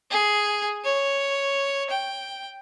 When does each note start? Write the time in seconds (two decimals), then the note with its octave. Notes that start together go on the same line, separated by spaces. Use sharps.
0.11 G#4
0.84 C#5
1.90 G5